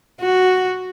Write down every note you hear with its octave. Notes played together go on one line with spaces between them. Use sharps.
F#4